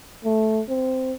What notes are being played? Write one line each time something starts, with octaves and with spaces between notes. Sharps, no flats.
A3
C4